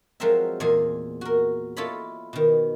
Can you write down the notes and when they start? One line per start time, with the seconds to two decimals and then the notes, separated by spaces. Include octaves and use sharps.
0.20 F3 F#3 G#3 C4 A#4 E5
0.60 E2 A#2 G#4 D#5 G#5
1.21 F#4 A#4
1.77 E4 F4 A4 C#5 D#5 B5
2.33 B2 D#3